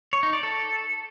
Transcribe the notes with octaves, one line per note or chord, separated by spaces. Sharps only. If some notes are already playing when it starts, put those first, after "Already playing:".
C#5
D#4
D5
A4